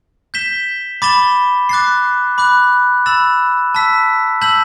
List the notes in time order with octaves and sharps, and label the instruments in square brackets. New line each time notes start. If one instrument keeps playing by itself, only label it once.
[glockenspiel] G6 B6 E7 G7
B5 D6 A6 E7 G7
D6 F#6 A6 C7
B5 D6 F#6
B5 E6 A6 E7
A5 E6 B6
A5 E6 G6 B6 F#7